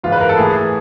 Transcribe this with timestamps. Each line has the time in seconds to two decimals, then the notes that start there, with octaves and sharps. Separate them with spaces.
0.03 G#2 E3 F4
0.12 B4
0.21 A#4
0.29 A4
0.37 A2 E3 G#4